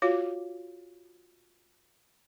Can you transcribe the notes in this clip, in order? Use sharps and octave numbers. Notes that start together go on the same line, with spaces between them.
F4 F#4 C#5 F5